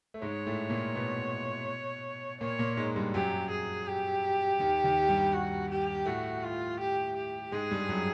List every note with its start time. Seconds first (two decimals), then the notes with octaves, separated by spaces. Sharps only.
0.14 A3
0.22 G#2 G#3 C#5
0.46 A2 A3
0.70 A#2 A#3
0.95 B2 B3
2.41 A#2 A#3 C#5
2.59 A#2 A#3
2.77 G#2 G#3
2.96 G2 G3
3.14 F#2 F#3 G4
3.50 G#4
3.87 G4
4.60 D#2 D#3
4.84 D#2 D#3
5.09 G2 G3
5.33 F#4
5.70 G4
6.06 A2 A3 F#4
6.43 F4
6.80 G4
7.16 G4
7.52 G#2 G#3 G#4
7.71 G2 G3
7.89 F#2 F#3